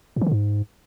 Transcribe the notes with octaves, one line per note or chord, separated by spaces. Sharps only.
A2
E3
D3
G#2